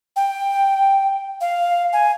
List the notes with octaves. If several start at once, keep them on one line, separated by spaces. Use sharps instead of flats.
G5
F5
G#5